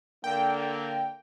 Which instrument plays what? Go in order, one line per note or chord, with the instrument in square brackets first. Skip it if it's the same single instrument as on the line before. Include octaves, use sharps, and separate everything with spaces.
[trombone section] D3 A#3 [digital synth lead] G5